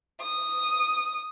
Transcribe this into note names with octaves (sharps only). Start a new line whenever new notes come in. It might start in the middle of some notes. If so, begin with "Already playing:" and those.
D#6